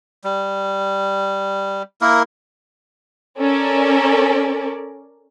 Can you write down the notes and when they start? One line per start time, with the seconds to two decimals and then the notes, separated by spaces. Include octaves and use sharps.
0.24 G3
2.01 A#3 E4 A#4
3.40 C#4 A4 A#4 D5